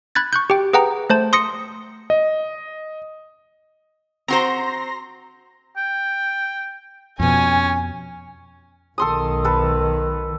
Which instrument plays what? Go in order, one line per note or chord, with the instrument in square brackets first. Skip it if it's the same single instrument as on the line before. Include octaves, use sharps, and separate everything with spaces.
[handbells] B5 F#6 G#6 A6
C#6 F#6 G6
G4 G5
G#4 B4 F#5 G5 A#5
A3 C5 A5
C6 D#6 A#6 C#7
[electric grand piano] D#5
[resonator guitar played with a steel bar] C4 F#4 C5 [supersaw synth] A#5 C6 A#6
[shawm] G5
[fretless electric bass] F2 B2 [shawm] C#4 [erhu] G#5
[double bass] B1 D#3 [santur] A4 C6 D#6
[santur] A4 B4